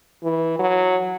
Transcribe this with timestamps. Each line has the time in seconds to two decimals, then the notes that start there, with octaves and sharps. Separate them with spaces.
0.24 E3
0.59 F#3